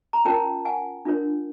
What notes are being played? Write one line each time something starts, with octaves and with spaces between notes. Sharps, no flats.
A#5
C#4 F4 A#4 C#5 G5 A5
F#5 G#5
D4 F4 A#4 C#5